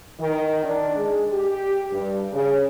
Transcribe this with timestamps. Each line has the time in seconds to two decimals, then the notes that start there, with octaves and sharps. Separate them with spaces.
0.20 D#3
0.64 D4
0.96 G#3
1.32 G4
1.92 G2
2.33 C#3